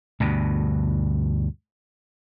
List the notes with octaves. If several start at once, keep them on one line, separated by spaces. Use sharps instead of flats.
D2 G2 B2